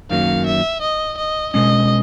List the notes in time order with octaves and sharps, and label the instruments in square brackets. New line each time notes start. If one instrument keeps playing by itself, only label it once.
[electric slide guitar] F#2 D#3 F#3 A#3 C#4 [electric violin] F5
[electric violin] E5
D#5
D#5
[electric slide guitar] B2 G#3 C#4 [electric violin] D#5